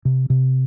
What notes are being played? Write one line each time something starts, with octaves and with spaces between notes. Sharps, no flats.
C3
C3